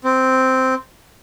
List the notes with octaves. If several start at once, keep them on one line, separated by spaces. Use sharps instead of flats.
C4